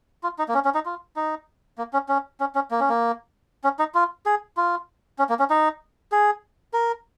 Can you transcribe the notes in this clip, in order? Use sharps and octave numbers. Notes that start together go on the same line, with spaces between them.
F4
D#4
A#3
C#4
C#4
D#4
F4
D#4
A#3
C#4
C#4
C#4
C#4
A#3
C#4
A#3
C#4
D#4
F4
G#4
F4
C#4
A#3
C#4
D#4
G#4
A#4